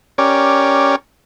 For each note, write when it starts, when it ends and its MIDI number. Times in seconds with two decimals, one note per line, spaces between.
0.18 0.96 61
0.18 0.96 67
0.18 0.96 70
0.18 0.96 73
0.18 0.96 74